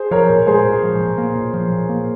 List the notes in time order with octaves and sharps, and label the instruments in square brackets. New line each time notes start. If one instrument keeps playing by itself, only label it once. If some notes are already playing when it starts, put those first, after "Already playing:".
Already playing: [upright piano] G#4 C5
[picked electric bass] F3 [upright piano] A#4 C#5
[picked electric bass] A#2
[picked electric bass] G#3 [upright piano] G#4 C5
[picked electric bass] A#2
F3
A#2
A#3
A#2
F3
A#2
A#3